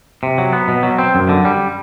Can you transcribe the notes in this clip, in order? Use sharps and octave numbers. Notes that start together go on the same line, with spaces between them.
C3
F#3
B3
B2
F#3
C4
F#2
D3
G3